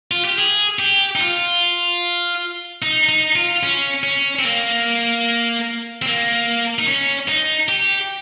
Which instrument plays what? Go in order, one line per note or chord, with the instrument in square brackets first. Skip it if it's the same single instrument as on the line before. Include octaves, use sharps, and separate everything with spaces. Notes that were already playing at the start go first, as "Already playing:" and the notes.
[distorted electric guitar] F4
G4
G#4
G4
D#4
F4
D#4
D#4
F4
C#4
C#4
C4
A#3
C4
A#3
D#4
C#4
D#4
G4